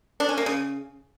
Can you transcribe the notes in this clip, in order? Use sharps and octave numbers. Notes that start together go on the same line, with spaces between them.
D4
C#4
A#3
C#3